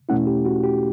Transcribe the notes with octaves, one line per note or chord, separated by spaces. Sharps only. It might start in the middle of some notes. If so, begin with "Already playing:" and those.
E2 B2 A3 C#4 E4 F#5
G4
F#4
G4